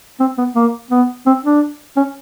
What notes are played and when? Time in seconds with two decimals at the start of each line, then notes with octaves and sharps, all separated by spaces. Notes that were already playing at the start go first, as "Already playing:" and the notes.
0.20 C4
0.38 B3
0.55 A#3
0.91 B3
1.26 C4
1.44 D4
1.97 C#4